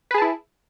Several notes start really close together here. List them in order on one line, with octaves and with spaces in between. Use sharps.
B4 G#4 A5 E4